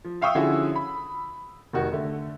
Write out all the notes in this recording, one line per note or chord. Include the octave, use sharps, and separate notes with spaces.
F3
E5 F5 G5 C#6 D#6 E6
D3 F3 C#4 E4 F#4 G#4
B5
F1 D#3 F#4
D3 A3